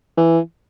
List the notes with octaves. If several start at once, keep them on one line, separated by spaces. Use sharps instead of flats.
E3